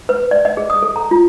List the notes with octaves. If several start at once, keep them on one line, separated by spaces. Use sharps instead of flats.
B4
D5
D#5
G#4
D#6
A4
A#5
F4